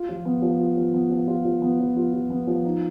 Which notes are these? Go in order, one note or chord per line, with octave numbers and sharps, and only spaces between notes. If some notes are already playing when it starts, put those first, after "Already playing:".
Already playing: F4
F3
B3
F3
F4
F3
B3
F3
F4
F3
B3
F3
F4
F3
B3
F3
D#4